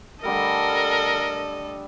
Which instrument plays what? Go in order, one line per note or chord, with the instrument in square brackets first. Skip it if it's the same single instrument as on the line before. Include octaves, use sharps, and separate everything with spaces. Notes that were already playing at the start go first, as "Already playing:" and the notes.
[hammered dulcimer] D3 G3 A3 [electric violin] A4 D#5 [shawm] A#4